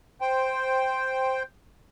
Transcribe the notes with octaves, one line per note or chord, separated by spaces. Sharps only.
C5 G5